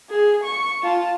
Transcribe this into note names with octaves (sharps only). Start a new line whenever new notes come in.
G#4
C#6
F4 A5